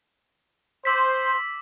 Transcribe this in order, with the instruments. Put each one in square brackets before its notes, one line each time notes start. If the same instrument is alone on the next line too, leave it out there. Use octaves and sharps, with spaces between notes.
[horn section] C5 [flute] C6 [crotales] D6 E6 B6